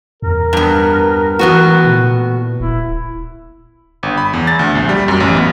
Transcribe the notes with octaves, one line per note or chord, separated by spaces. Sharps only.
E2 A#4
G2 B3
A2 E3 B3 F#4
A#2
D1 E4
G1
B5
E2
A6
D2
A#1
G3
F#2
A1
B3